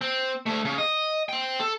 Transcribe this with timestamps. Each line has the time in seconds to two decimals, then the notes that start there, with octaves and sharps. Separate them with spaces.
0.01 C4
0.46 D2 A3
0.65 C#3
0.78 D#5
1.29 C4 G5
1.60 A4